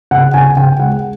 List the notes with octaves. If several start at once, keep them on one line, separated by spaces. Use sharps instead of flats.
C#3 F#5
C#3 G#5
C#3 G5
G#3 F#5